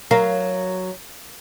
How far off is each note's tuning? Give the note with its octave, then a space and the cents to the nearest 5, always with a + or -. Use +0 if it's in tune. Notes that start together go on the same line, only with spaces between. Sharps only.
F#3 +0 A#4 +0 F5 -15